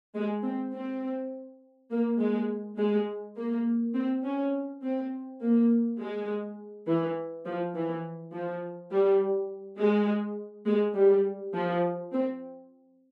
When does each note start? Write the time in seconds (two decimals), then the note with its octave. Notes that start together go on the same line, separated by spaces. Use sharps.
0.15 G#3
0.44 C4
0.74 C4
1.91 A#3
2.19 G#3
2.78 G#3
3.36 A#3
3.95 C4
4.24 C#4
4.83 C4
5.41 A#3
6.00 G#3
6.87 E3
7.45 F3
7.75 E3
8.33 F3
8.91 G3
9.79 G#3
10.67 G#3
10.95 G3
11.54 F3
12.12 C4